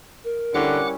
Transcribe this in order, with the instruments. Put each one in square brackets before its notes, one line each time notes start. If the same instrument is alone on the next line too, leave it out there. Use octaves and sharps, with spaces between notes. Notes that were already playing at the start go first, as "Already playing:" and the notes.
[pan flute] A#4
[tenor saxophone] D3 [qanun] G3 C#4 E4 [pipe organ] F#5 D6 F#6